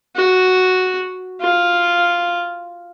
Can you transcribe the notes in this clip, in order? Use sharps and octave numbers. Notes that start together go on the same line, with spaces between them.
F#4
F4